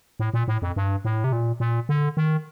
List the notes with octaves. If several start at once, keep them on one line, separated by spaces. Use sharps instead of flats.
A2
A#2
A2
F2
G2
A2
C3
A#2
A#2
D3
D#3